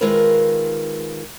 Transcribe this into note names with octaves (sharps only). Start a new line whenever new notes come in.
D#3 G#3 C4 F4 A#4 B4